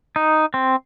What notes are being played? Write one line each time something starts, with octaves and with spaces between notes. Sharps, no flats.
D#4
C4